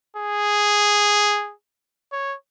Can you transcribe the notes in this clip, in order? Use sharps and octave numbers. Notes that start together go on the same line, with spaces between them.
G#4
C#5